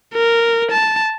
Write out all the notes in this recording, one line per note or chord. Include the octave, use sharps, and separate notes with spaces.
A#4
A5